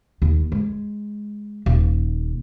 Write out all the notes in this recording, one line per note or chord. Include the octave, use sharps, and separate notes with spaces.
D#2
G#3
D#1